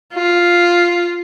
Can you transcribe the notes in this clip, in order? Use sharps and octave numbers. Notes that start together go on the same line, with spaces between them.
F4